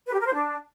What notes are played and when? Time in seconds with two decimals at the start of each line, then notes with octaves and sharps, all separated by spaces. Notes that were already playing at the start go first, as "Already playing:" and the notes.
0.06 B4
0.13 G4
0.20 A#4
0.26 C5
0.33 D4